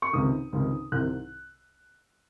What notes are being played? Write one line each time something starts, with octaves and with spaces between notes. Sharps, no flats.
C#6
C#2 C3 D#3 D#6
C#2 C3 D#3
C2 C3 D#3 F#6